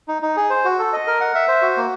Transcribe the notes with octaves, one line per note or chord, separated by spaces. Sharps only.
D#4
D#4
G#4
C5
F#4
A4
D#5
A#4
F#5
E5
C5
F#4
A#3